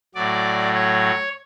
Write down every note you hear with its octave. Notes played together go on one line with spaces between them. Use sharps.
A2 F#3 D5
C#5